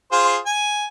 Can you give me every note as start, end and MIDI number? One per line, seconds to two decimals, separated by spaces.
0.12 0.38 65
0.12 0.38 68
0.12 0.38 72
0.46 0.85 80